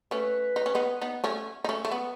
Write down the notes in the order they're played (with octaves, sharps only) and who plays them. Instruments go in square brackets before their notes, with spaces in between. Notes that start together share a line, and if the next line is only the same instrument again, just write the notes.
[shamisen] A3 C#4 [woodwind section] B4
[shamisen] D#4
C#4
B3 D#4
B3 D#4
A3 C#4
D#4
A3 C#4
A3
B3